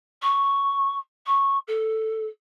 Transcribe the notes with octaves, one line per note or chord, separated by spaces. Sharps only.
C#6
C#6
A4